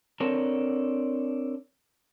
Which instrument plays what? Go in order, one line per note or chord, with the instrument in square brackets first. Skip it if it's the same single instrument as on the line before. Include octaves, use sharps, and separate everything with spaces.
[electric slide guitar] C4 D4 A4 A#4 C#5